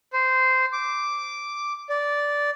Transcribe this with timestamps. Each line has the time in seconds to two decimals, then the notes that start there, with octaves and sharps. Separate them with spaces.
0.13 C5
0.73 D6
1.90 D5